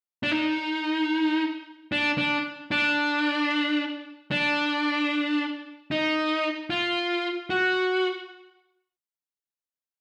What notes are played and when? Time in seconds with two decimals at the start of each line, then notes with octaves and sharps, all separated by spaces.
0.23 D4
0.31 D#4
1.92 D4
2.18 D4
2.71 D4
4.31 D4
5.91 D#4
6.70 F4
7.50 F#4